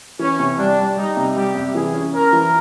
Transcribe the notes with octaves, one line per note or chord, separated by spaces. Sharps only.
E3 C#4
C3
G3 D4
G3
G3 D#4
C3
G3 G4
C3
E3 G#4
C#4
C#4 A#4
E3